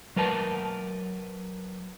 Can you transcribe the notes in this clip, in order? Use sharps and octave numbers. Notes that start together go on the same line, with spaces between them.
F#3 A#4 B4 A5